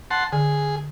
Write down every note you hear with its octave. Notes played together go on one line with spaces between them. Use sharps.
F#5 A5 C6
D3 G#4